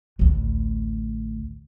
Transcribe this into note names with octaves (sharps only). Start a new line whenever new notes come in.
A1 D2